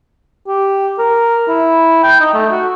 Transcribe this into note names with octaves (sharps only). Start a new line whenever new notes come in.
G4
A#4
E4
G5
D#4
A3
F#4